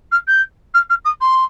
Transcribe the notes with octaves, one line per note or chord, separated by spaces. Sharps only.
F6
G6
F6
F6
D#6
C6